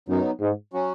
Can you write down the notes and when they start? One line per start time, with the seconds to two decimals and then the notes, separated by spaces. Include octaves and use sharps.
0.09 F#2 F#3 B3 D#4
0.41 G#2
0.73 F#3 C#4 F#4